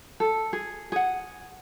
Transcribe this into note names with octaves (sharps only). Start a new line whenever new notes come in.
A4
G#4
G#4 F#5